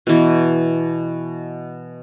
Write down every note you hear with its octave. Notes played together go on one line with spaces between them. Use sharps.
B2 E3